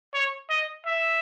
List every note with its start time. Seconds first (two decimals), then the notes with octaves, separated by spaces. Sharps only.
0.14 C#5
0.50 D#5
0.86 E5